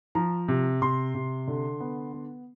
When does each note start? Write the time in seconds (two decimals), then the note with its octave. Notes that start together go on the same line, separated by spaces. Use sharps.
0.15 F3 A#5
0.48 C3
0.82 C3 C6
1.15 C3
1.48 D3
1.80 B3
2.14 B3